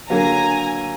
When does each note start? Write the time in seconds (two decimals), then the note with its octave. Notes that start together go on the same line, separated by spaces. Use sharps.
0.09 D3 F#3 A#3 G#5 A#5